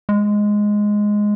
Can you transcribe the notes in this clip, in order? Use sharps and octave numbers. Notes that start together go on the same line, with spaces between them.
G#3